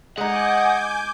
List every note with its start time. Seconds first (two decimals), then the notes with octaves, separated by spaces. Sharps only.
0.18 G#3 D#4 D#5 F#5 G#5 D6 G6